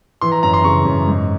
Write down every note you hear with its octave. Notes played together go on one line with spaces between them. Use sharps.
E3 C6
A#5
F#2 A#5
C6
C#3 C#6
F#2
G#2